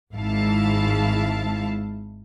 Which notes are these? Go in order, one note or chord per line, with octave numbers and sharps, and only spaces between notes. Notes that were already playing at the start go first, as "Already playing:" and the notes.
G#1 G#2 E4 F5 A5